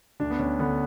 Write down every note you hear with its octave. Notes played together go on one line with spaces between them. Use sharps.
D2 D4
B3
D2 C#4
D3 B3